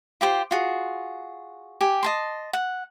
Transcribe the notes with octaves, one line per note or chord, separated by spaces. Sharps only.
F4 G4 C5
F4 F#4 G#4
G4 G#5
D#5 A5 C6
F#5